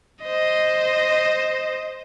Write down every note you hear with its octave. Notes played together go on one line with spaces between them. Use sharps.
C5 D#5